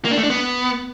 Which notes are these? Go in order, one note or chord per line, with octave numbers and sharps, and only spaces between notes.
A#3
D4
A3
D4
B3